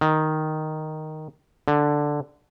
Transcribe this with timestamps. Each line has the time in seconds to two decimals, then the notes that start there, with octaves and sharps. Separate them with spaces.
0.01 D#3
1.68 D3